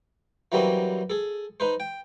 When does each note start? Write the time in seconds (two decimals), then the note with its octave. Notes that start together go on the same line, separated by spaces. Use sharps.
0.52 E3 F#3 G3 A#3 C4 C#4
1.10 G#4 A4
1.60 D#4 B4 C5
1.80 G5